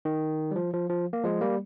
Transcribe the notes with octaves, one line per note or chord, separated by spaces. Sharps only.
D#3
G3
F3
F3
F3
A#3
F3 G#3
G3 A#3